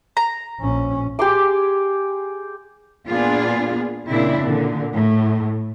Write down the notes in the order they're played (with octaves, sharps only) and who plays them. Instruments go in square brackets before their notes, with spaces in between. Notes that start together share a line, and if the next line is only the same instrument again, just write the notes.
[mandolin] A#5
[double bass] A#1 C#4
[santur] G4 G#4 C6 D6
[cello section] A#2 B3 D4 F4 G#4
A#2 C#3 C4 D4 E4
A#2 D3
A2